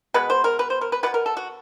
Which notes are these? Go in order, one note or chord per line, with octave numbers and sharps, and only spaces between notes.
B2 G#3 B3 B4
C5
A#4
B4
C5
A#4
B4
B2 G#3 B3 B4
A#4
A4
F#4